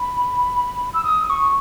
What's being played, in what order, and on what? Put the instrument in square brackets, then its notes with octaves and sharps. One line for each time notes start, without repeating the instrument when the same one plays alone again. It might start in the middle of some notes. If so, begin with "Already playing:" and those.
Already playing: [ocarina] B5
E6
D#6
C#6